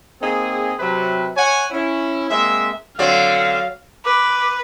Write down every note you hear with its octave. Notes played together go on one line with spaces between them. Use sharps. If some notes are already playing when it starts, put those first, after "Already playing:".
A#3 C4 D#4 G#4
C3 F#3 B4
C#5 F#5 G#5
C#4 E4
G#3 A#3 C4 E5
D3 F#3 C4 D5 F5
B4 D6